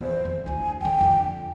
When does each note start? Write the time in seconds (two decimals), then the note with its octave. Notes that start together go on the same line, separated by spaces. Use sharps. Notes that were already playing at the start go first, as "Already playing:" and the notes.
0.01 E2 C5
0.25 F2
0.46 D2 E4 G#5
0.81 D3 F4 G5
1.01 F2 D3